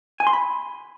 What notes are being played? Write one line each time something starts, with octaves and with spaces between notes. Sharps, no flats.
G#5
C6
B5